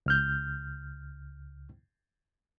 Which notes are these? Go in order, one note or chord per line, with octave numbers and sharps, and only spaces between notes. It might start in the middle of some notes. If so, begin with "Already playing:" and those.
C#2 F6 G6